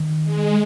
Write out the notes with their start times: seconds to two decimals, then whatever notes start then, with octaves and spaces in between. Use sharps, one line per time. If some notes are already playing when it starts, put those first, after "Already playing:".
Already playing: D#3
0.24 G#3